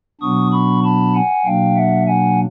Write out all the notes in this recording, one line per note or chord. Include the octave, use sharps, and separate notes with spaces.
B2 F#3 B3 D4 C#6 D#6
B5 C#6
A5 B5
F#5 G#5
B2 F#3 A#3 D4 F5 G5
E5 F#5
F#5 G#5